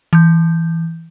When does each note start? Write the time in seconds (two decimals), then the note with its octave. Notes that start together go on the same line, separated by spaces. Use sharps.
0.13 E3 G6